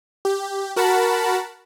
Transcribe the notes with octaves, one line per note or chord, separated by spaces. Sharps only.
G4
F#4 A#4 F#5 A5 B5